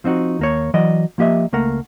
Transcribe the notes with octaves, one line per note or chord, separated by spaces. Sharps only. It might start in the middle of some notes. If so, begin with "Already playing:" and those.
F3 C4 D#4 F#4
D#2 A#3 C#5
E3 F#3 D5 D#5
F3 A#3 G4 D#5 E5
C#2 A3 A#3 A#4 F#5